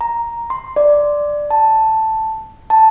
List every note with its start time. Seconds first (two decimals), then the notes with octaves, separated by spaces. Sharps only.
0.01 A#5
0.50 C6
0.76 D5
1.51 A5
2.70 A5